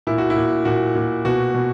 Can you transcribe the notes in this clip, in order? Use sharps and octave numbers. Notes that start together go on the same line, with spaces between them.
A#2 E4
F#4
E4
A#2
A#2 F#4
A#2
B2 F#4
B2